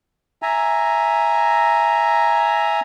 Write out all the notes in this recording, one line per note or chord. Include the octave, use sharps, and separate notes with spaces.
E5 G#5 A#5